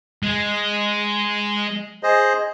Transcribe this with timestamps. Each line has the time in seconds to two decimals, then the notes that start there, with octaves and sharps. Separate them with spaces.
0.23 G#3
2.03 G#4 C5 D#5